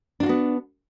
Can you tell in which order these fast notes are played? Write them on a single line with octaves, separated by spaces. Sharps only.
D4 F4 F#4 B3